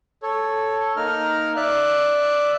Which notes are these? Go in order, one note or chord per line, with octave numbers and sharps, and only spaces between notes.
A4 C#5
A#3 D#4 A#4 F6
D5 E5 F#6